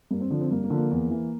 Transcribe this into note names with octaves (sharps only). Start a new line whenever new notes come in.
G2 A#3
C4
D3 F3 D4
C4
G2 A#3
A#3
D3 F3
A#3
E2
E3